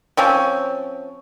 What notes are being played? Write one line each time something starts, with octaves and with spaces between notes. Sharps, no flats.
F3 C4 C#4